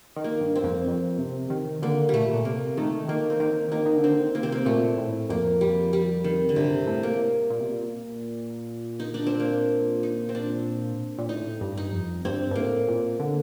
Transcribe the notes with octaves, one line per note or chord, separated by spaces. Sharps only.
D#3
A#3
G2
C4
F2
F2
C3
D#3
D3 A#3
A#2 G3 A3
A#2
C3 A#3
D#3 A3
D#3 A#3
C4
D#3 A#3
D#3 A#3
D#3
D3
C4
D#3
A#3
C3 C4
A#3
A#2 A3
A2
F2 A#3
G3
G3
D#3
D3
G2 C3
A2
A#3
A#2
C3
A#2
D#4
D4
C4
A#3
D#4
C4
D4
A#2
A2 D#4
G2
D#4
F2
G2 C4
G2
A2 A#3
A#2
D3